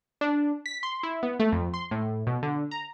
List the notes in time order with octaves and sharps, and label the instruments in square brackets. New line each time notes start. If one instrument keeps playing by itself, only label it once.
[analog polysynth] D4
B6
C6
E4
B3
A3
F2
C6
A2
B2
D3
A#5